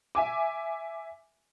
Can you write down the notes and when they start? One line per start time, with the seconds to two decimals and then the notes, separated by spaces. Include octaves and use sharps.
0.15 E5 G#5 D6